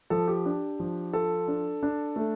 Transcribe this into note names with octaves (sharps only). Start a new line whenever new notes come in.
F3 A4
G4
D4
F3
F4 A4
D4
D4
A3